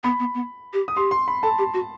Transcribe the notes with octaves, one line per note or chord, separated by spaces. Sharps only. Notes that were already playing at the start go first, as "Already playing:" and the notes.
B3 B5
B3
B3
G4
D#6
G4 C6
C6
B5
A4 A5
G4
F#4